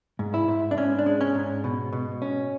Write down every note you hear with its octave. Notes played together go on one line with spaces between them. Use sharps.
G#2
E4
G#2
D4
G#2 C#4
D4
G#3
C#4
G#2
B2
B2
C#4